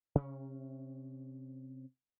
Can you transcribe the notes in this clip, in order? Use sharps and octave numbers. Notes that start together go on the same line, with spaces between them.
C3 C#4